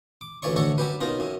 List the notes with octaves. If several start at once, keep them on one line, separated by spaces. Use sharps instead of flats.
D6
A1 D2 E3 C#5 D5 C#6
D2 D4 F#4 A4 C#5 C#6
F#3 C#4 G4 B4
B2 C#4 D#4 F4 A#4
F#2 C#4